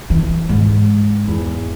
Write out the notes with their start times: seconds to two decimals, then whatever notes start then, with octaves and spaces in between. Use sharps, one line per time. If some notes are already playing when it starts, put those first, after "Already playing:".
0.10 E3
0.49 G#2
1.28 E2